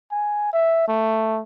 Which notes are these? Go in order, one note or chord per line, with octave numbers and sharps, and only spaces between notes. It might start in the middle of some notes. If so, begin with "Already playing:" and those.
G#5
E5
A3